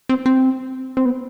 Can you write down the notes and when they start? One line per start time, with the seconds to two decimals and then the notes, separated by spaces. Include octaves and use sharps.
0.09 C4
0.26 C4
0.97 C4
1.05 B3